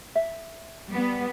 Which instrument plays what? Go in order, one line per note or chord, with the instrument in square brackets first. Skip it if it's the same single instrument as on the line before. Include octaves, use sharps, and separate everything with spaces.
[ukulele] E5
[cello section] G3 B3